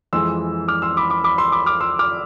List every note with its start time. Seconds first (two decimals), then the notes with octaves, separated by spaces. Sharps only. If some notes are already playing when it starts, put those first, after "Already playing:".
0.13 F2 E3 G#3 C6 E6
0.68 D6 F6
0.82 C6 E6
0.97 B5 D6
1.10 B5 D6
1.24 B5 D6
1.38 C6 E6
1.52 B5 D6
1.66 D6 F6
1.80 C6 E6
1.99 D6 F6